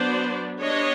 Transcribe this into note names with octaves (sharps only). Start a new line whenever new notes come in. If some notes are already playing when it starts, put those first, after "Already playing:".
Already playing: F#3 B3 D4 C5 D5
G3 B3 D4 C#5 D#5